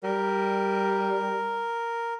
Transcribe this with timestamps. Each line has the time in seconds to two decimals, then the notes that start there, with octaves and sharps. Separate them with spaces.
0.04 G3 A#4